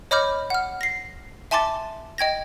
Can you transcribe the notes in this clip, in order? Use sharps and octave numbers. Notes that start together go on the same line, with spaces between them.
C#5 D#5 B5 D6 F6 G6
F#5 F6
A#6 C7
E5 G#5 A5 C6 D6 A6
D#5 G5 G#6 A#6